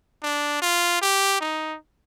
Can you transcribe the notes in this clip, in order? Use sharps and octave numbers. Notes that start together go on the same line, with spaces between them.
D4
F4
G4
D#4